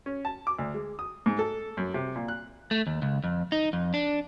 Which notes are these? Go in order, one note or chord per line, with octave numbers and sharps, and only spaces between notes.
C#4
A5
D6
D2
G#3
D#6
G#2
A4
F#2
C3
A#2
F#6
A3
D#2
C#2
F2
D#4
F2
D4